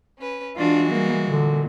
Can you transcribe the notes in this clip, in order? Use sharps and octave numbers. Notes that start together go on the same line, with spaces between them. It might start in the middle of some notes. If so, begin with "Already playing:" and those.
C#4 B4
E3 G#3 D4 F4 F#4
G3 A#3
A#2 D3